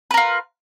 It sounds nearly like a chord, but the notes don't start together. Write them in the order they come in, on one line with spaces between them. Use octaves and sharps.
B4 A#4 F4